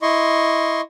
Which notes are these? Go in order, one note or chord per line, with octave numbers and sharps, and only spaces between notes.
E4 D#5 C6 C#6